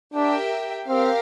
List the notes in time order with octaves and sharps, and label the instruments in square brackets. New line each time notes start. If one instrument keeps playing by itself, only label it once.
[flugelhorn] D4 [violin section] G4 A#4 E5 G5
[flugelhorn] C4 [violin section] G4 A#4 F5